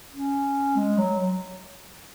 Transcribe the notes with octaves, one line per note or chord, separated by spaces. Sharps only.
C#4
G#3
F#3